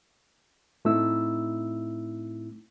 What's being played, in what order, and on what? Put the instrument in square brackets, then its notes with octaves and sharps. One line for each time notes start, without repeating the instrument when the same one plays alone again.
[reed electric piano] A2 A3 C4 D#4 E4 E6